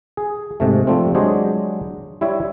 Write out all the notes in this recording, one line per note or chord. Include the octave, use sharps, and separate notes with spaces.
G#4
G#2 C3 A3
F3 G3 A3 C4
F#3 G#3 D4 C5 C#5 D#5
G3 E4 C#5 E5